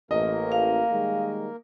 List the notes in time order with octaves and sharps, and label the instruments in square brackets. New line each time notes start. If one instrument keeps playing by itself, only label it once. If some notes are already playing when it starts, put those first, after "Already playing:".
[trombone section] A1 [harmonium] A#3 A#4 [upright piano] D#5
[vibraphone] F5
[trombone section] D#3 G3 G#3